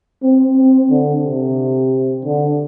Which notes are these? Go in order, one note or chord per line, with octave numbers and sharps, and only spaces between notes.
C4
C4
D3
C3
D3